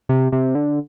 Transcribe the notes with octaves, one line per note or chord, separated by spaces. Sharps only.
C3
C3
D3